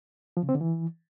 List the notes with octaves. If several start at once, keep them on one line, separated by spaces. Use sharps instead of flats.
F3
C#3
C4
D3
E3